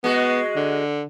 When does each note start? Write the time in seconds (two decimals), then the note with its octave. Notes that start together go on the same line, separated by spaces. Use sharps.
0.04 G#3 B3 F#4
0.56 D3